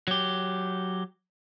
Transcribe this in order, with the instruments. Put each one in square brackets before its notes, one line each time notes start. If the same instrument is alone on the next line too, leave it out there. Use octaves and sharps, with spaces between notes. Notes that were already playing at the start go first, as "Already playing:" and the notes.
[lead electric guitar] F#3 G4